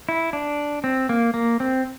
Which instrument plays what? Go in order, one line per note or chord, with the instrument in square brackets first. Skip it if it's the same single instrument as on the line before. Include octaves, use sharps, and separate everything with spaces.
[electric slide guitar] E4
D4
C4
A#3
A#3
C4